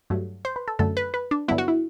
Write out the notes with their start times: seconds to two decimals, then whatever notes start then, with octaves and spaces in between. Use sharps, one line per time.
0.10 G2 F#3 A3
0.45 C5
0.56 B4
0.68 A4
0.79 F#2 D3 F#3 A3 A4
0.97 B4
1.14 B4
1.31 D4
1.48 G2 D3 F#3 B3 E4
1.58 F#4
1.68 E4